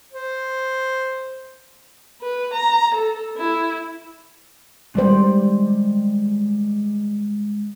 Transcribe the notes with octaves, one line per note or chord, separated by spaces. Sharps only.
C5
B4
A#5
A4
E4
D#3 G3 G#3 C5 D5 G5